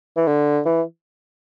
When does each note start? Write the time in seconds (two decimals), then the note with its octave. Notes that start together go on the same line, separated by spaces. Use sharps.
0.16 E3
0.27 D3
0.65 E3